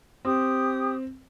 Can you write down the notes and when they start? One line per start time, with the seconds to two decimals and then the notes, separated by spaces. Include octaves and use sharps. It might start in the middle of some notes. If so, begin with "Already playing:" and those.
0.25 C4 G4 D#6